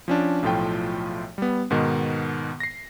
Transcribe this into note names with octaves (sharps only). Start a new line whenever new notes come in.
F3 C#4 D4
B1 A2 F3 A3 F4 G5
G3 B3
G#2 B2 D#3 B3
A#6 C7